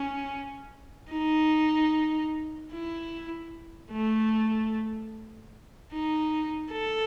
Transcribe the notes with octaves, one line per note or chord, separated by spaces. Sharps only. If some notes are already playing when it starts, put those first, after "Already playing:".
Already playing: C#4
D#4
E4
A3
D#4
A4